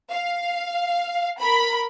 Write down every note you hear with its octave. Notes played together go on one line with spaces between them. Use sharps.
F5
A#4 B5